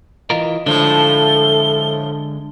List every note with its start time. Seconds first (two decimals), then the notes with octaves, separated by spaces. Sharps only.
0.30 E3 F4 A#4 D#5
0.66 A2 D3 F3 G#3 A3 D4 A4 G7